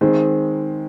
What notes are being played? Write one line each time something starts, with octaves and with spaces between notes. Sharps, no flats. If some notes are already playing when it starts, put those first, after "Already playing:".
D#3 G#3 C4